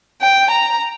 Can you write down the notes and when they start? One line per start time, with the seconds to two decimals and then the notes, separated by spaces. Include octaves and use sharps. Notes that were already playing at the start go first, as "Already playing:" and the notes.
0.22 G5
0.51 A#5